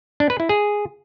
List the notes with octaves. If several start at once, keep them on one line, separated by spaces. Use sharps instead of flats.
D4
B4
E4
G#4